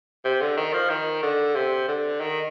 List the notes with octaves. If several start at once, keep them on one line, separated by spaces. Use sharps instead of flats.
C3
D3
D#3
F3
D#3
D3
C3
D3
D#3